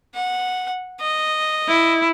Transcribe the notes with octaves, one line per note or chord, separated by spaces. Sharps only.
F#5
D#5
E4